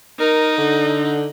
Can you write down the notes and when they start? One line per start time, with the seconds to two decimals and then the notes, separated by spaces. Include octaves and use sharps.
0.20 D#4 A#4
0.57 D3